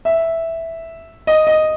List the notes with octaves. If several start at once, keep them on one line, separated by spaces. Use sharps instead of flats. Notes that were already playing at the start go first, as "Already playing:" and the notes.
E5
D#5
D#5